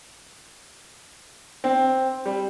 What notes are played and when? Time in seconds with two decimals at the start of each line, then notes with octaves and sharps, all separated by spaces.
1.64 C4
2.26 G3